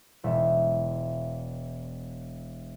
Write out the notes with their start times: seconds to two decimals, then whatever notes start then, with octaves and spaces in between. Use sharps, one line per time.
0.24 E1 E5